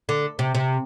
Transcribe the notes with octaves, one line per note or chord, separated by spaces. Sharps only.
D3
C3
C3